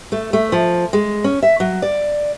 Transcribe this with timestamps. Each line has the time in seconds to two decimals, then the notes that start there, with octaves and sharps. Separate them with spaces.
0.12 A3
0.33 A3
0.52 F3
0.93 G#3
1.24 C#4
1.43 E5
1.60 F#3
1.82 D5